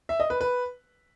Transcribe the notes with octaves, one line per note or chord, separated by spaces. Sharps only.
E5
D#5
B4
B4